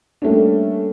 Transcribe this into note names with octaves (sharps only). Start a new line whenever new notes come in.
G3 A3 A#3 C#4 D4